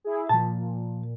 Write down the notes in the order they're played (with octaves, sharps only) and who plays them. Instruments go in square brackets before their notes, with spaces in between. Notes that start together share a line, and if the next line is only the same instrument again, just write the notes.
[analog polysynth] E4 G#4
[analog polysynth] A#2 [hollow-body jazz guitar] F3 A5